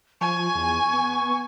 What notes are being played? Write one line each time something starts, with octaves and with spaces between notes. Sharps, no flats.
F3 G#5 C#6
E2
B3